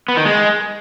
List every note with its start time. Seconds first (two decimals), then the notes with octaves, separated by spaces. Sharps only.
0.08 B3
0.17 D#3
0.25 G#3